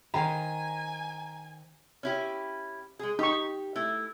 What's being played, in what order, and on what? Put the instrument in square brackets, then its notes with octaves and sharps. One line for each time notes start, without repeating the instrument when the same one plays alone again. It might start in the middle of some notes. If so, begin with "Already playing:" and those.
[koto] D#3 C5 F5 [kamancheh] G#5 [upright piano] A#5
[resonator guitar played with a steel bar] C#4 E4 G4
G#3 G#4
[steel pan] D#4 C#6 [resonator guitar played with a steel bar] G4
[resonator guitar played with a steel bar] A3 E4